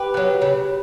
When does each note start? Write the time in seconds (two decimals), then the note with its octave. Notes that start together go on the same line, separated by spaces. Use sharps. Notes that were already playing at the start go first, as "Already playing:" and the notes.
Already playing: G4 B4
0.14 F#3 B3
0.42 C#3